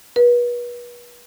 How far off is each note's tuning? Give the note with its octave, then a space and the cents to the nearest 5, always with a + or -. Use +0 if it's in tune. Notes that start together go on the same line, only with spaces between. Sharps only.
B4 -35